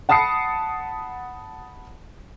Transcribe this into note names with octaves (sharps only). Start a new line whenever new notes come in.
F#5 A5 B5 D#6 C7 C#7